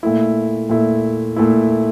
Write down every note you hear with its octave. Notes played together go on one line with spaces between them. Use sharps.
A#2 A3 E4
A#2 A3 E4
A#2 A3 E4